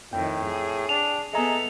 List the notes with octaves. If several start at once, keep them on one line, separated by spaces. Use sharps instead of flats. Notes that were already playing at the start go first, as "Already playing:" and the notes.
F2 A2 D#3 G5
G#4
D4 F7
B3 G#4 A4 D#5 E5 A#5